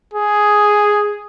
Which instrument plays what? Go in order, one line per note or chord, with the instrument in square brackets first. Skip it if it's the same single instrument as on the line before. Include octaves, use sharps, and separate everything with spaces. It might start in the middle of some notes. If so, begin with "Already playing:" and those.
[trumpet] G#4